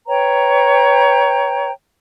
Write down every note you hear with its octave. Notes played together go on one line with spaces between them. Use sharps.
B4 C#5 G5 A#5